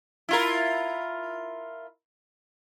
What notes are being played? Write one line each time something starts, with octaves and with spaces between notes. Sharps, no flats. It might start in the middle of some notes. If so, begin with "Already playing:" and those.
E4 F4 A#4